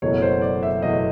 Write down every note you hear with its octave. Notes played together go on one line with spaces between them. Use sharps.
F#1 E2 B2 F#3 A3 C#5
C5
D5
E5
F#1 E2 B2 F#3 A3 D#5